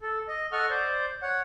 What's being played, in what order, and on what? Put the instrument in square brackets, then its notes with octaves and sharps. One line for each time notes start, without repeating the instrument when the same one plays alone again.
[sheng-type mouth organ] A4
D#5
A4 D#5 F#5 C#6 F6
C5 D5
C#5 F#5